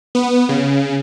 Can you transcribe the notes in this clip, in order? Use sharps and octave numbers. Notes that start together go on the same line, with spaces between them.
B3
C#3